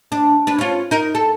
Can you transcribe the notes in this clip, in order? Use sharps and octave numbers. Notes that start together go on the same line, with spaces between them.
D4
D4 B4
C#4 F4
D#4 A#4
A4